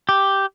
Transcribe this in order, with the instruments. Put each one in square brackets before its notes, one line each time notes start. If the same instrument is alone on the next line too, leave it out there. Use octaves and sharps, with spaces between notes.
[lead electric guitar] G4